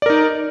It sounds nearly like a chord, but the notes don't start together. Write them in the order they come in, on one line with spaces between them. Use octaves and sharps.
D5 A#4 D#4